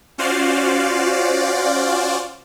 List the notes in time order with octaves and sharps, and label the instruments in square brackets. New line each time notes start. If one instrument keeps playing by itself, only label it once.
[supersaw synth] C#4 F4 F#4 C5 D5 F5